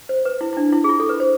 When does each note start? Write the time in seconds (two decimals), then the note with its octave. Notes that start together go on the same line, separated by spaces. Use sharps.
0.09 C5
0.25 B4
0.41 E4
0.53 E4
0.57 D4
0.73 E4
0.84 G#4
0.89 F4
1.00 A4
1.09 B4
1.20 C5